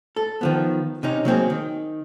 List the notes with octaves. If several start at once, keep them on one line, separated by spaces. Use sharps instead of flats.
A4
D#3 F3 B3
C3 C#4 D#4
F#3 A#3 C4 G#4
D#3